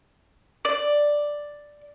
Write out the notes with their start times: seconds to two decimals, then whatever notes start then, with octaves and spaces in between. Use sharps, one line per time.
0.65 D5